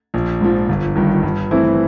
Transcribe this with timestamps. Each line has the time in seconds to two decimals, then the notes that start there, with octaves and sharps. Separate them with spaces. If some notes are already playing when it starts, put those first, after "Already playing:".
0.14 A#1
0.41 G#2 F3
0.69 G1
0.96 G2 D#3
1.23 G2
1.51 E3 A3 C4 E4